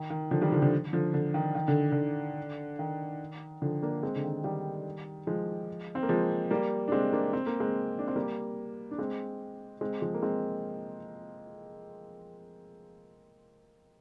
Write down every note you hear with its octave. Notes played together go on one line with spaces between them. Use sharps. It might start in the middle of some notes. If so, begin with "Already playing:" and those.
Already playing: D#3
D#3
D3 F3
D#3 G3
D3 F3
D3 F3
D3 F3
D3
D#3
D#3
D3
D3
D#3
D3 F3
A#3 D4
G#3 C4
D3
D#3
D#3 G3
F3 G#3
C4
A#3
F3 G#3
G3 A#3
D4
G#3 C4
A#3 D4
C4
A#3
G#3 C4
D4
C4
G3 A#3
D4
G#3 C4
G#3 C4
F3 G#3
A#3
G#3 C4